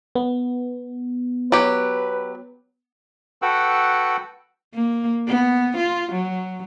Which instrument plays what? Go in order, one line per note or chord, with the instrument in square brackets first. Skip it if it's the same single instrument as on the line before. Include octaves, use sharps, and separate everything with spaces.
[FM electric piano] B3
[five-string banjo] F#3 G4 [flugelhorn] B4
[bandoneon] F#4 A4 B4 F#5 G5 E6
[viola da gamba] A#3
B3
F4
F#3